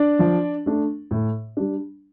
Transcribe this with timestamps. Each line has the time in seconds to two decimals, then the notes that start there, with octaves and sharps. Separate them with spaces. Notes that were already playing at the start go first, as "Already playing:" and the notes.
Already playing: D4 D5
0.19 F3
0.66 A3 D4
1.11 A2
1.57 G3 D4